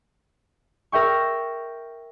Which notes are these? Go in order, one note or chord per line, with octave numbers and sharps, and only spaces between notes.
A#4 E5 G5 C#6